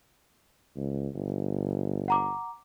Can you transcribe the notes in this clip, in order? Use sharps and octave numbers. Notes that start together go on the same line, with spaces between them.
C#2
G1
F#5 A#5 D6